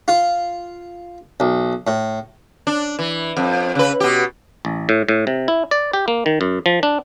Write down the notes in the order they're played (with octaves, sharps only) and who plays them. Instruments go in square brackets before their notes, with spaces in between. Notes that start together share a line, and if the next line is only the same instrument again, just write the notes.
[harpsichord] F4
B1
A2
[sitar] D4
E3
F2
C#3 B4
B2 G4
[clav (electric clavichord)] A1
A2
A2
C3
E4
D5
G4
A#3
D#3
F#2
F3
D4